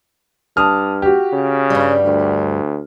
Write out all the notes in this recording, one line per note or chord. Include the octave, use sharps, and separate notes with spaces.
G2 A5 D#6 F6
F#4 G4
C#3
G2 G3
D2